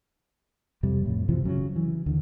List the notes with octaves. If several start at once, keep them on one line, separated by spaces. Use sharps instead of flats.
F2 C3 G3
F2 A2
F#2 C3 E3 F3
C#3 F#3
E3
D#2 D3